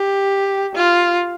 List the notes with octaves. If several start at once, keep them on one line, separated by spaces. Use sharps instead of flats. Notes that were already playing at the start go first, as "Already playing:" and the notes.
Already playing: G4
F4